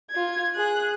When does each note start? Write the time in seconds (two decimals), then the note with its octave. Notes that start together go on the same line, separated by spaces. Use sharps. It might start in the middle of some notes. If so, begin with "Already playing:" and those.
0.11 F4 G#6
0.55 G#4 F#6